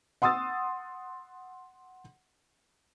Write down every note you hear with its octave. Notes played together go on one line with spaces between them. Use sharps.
F#5 C6 D#6 E6 A6